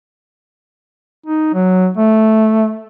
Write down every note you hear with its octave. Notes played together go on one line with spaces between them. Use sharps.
D#4
F#3
A3